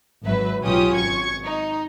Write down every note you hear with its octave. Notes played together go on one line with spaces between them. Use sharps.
G#1 F#3 B4 E5
B1 F#3 C#4 F4 G4 D#6
G#1 C#6 G#6
D#4